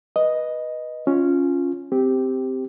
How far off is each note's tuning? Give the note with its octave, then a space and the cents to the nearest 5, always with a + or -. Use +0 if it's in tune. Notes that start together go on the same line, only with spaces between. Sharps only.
B4 -10 D#5 +0
C#4 +0 F4 +0
C4 -10 G4 +0